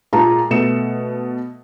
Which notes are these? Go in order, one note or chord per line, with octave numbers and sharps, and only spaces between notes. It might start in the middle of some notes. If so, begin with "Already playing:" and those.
A#2 G#3 F4 A5 A#5
B2 A3 C#7 E7